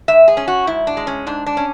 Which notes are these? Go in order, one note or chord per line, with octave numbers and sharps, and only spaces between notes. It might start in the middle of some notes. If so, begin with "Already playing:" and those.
G#2 E5
G#4
C#4
F#4
G#2 E4
D4
G#3
C#4
G#2 D4
D4
C#4